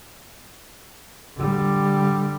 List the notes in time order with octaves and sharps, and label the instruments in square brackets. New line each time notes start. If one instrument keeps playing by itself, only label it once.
[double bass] D3 G3